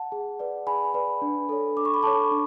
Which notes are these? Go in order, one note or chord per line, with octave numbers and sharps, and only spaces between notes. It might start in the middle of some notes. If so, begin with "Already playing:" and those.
Already playing: F#5 A5
G#4
B4 D5
G#4 G#5 B5
B4 D5
D4
A4 C#5
D4 D6
C#6
B5
A4 C#5 A5 C#6
D4